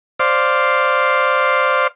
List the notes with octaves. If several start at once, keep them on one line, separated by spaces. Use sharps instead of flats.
C5 D5 F5